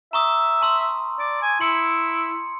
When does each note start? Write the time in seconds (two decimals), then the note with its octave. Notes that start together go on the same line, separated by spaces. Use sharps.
0.13 E5 A#5 C#6 D#6
0.62 A5 C6 E6
1.19 D5
1.42 G#5
1.61 E4 C6 C#7